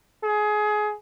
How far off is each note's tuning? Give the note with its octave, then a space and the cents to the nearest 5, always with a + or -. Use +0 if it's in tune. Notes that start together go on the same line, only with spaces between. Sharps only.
G#4 +20